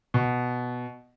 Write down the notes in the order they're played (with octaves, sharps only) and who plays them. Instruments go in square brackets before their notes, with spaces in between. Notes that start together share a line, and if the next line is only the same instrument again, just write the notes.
[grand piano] B2